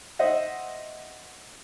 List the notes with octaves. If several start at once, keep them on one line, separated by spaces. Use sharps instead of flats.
C5 D#5 E5 F#5